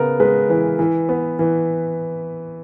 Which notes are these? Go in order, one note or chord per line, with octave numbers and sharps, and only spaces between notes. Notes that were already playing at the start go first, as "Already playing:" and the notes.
Already playing: C#3 B3 A#4
G#3 B4
E3 B4
E3
B3
E3